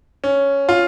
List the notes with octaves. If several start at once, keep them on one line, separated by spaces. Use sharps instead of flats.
C#4
F4